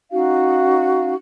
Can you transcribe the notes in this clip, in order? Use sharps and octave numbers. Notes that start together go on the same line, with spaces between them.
C#4 D#4 F#4 F5